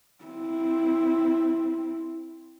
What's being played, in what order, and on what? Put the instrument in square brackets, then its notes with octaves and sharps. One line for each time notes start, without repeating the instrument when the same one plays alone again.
[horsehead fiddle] C4 E4